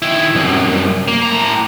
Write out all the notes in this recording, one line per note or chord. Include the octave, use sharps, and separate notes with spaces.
D#3 E4
C2 F#2
A#3
A2 A#5